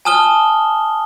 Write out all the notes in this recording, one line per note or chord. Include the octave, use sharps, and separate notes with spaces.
G#5 A5 D#6 F6 G7